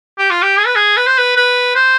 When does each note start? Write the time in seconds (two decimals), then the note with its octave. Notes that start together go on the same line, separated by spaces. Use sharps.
0.19 G4
0.31 F4
0.43 G4
0.58 G#4
0.66 B4
0.76 G#4
0.97 B4
1.07 C5
1.18 B4
1.37 B4
1.76 C5